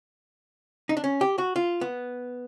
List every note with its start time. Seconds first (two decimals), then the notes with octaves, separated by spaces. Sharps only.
0.89 D#4
0.97 D4
1.04 C#4
1.21 G4
1.38 F#4
1.56 F4
1.81 B3